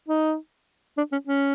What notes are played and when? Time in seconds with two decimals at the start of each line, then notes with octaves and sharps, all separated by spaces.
0.08 D#4
0.98 D4
1.12 C#4
1.27 C#4